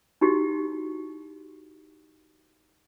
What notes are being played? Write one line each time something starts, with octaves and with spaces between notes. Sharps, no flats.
D#4 E4 F#4 G4